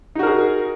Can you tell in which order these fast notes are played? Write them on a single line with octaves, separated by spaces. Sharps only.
D#4 F#4 A#4 G#4